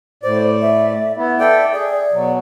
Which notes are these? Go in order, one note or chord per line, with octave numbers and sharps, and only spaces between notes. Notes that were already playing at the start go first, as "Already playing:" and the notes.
A2 C5 D5
E5
B3 E4
A4 D5 E5 G5
G#4 D5
B2 F#3